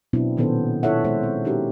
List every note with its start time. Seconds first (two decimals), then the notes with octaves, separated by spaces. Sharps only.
0.13 B2 F#3 B3 C4 D4 E4
0.37 A#2 D#3 B3 C#4 A4 C5
0.83 E4 F4 A4 C#5 E5 F#5
1.04 G#3 B3 A4 C5
1.23 C4
1.45 C#4 D#4 F#4 G4 A#4